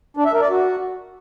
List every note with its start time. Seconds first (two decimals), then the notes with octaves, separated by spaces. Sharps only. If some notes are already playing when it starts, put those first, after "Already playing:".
0.17 D4
0.25 E5
0.33 A#4
0.41 D5
0.50 F#4